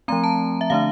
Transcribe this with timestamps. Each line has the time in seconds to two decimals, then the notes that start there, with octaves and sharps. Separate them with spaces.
0.08 F3 A3 C4 A#5
0.24 A5
0.61 E5
0.70 D3 A3 D4 F5